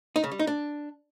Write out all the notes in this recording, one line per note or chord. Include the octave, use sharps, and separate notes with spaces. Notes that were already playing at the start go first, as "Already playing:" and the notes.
D#4
C#3
G3
D#4
D4